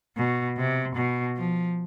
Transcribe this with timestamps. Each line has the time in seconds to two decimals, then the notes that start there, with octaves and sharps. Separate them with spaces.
0.17 B2
0.57 C3
0.96 B2
1.37 F3